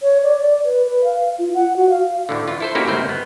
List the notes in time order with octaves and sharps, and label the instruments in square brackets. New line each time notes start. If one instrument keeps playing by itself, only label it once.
[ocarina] C#5
D5
B4
B4
F5
F4
F#5
F#4
F5
[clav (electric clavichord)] D2 A2 D3
E3 F4
E4 A4 C5
A#3 C#4 D#4 E4 F#4 G4
G1 C#2 A3 A#3 C4 C5
B3